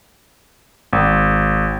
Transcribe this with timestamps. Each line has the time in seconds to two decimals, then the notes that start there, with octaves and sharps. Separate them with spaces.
0.93 G#1